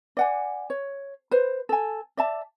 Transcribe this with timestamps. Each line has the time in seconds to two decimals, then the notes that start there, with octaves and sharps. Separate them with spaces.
0.17 D5 F#5 G#5
0.70 C#5
1.31 B4 C5
1.69 A4 G#5
2.17 D5 E5 A5